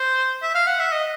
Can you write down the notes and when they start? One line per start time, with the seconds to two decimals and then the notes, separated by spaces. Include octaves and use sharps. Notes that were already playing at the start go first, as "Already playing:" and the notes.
Already playing: C5
0.42 E5
0.55 F5
0.67 F#5
0.80 E5
0.92 D#5